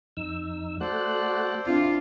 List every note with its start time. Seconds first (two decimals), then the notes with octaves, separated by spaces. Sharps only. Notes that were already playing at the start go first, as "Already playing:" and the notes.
0.17 F2 D#4 E6
0.80 A3 F#4 A4 C5 D5 F#6
1.66 C4 D4 E4 F4